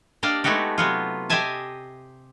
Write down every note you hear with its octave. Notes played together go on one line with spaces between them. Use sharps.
A#3 D4 G4 D5 D#5 F5
G#3 A3 B3 D#4 F#4 G4
C3 F#3 B3 F4
G4 C5 D#5 E5 G#5 A5